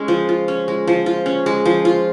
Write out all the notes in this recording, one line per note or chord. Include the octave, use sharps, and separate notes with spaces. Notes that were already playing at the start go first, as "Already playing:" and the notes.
Already playing: G#3 C#4
F3
F4
C#4
G#3
F3
F4
C#4
G#3
F3
F4